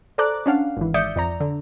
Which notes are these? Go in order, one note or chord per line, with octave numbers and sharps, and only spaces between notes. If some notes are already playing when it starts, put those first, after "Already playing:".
A4 C5 D5 A#5 D6 F#6
C#4 D4 F5 F#5
G#1 E3
G#1 D5 E5 D#6 G6 C#7
F2 D5 A#5
D3